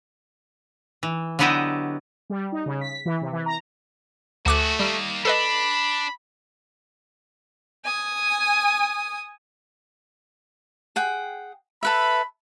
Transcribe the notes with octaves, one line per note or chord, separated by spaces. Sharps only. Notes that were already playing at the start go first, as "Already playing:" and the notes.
E3
D3 F#3 B3 E4 G4 D#5
G3
D#4
C#3
B6
E3
C3
E3
A#5
D2 A3 F#4 G#4 D6 F#6
D#3 G3 A#3
D4 A4 B4 D#5 B5
G#5 D#6
G#4 F#5 G5
A4 B4 E5 B5